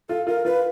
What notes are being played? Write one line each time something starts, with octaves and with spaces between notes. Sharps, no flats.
F4 A4
F4 A#4
F4 B4